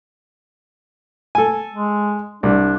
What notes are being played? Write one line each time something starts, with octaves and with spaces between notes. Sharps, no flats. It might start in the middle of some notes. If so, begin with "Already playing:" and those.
A4 G#5
G#3
C2 D4